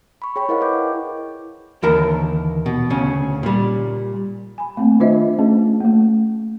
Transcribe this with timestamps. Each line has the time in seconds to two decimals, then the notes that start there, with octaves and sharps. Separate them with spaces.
0.22 B5 C#6
0.36 G#4 C#5 G5 B5 C#6
0.49 E4 A#4 C5 D#5 F5 F#5
0.61 G#4 B4 D6 G6
0.73 E4
1.83 D#2 D3 E3 A#4 A5 A#5
2.66 B2
2.90 D2 C#3 C#4
3.43 A#2 G3
4.58 G#5 B5
4.77 A3 A#3 C4 F5
5.00 D#3 D4 F4 C5 D#5 E5
5.39 A3 C#4 G#4
5.80 A3 A#3